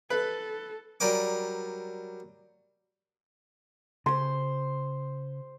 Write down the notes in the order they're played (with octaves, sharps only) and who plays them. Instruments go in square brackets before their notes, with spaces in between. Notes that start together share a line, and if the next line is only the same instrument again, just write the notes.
[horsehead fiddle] A4 [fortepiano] B4
[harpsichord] F#3 G3 A#4 D5 G#5 D6
[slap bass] C#3 [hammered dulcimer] C5 C6